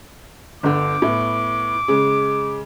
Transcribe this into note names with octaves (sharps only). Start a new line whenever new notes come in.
G1 D3 D6
A2 B3
C#3 G#3